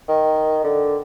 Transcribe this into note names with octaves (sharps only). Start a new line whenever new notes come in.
D#3
D3